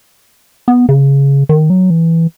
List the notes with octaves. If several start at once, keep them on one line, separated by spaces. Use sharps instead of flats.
B3
C#3
D#3
F#3
E3